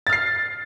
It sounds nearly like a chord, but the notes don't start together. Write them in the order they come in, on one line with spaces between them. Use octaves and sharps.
A6 F6 C7